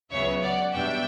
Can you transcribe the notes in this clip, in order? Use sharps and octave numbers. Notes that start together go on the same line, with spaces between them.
C#2 C#3 F#3 B3 C#5 E5
D5 F#5
E2 B2 G3 D4 E5 G5